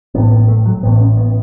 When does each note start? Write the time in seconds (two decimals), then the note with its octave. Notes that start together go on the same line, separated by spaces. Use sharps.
0.15 A1 A2 B3
0.31 B3
0.48 A3
0.66 F#3
0.83 A1 A2 B3
1.00 C#4
1.17 B3